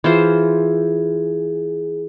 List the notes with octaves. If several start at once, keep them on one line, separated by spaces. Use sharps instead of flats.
E3 F4 G#4 C5